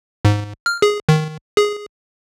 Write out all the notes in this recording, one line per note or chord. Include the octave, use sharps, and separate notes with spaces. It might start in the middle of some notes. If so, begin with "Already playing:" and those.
G#2
F6
G#4
D#3
G#4